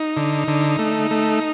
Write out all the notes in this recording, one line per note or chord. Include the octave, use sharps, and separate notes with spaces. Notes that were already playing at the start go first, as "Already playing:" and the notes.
Already playing: D#4
D3
D3
A3
A3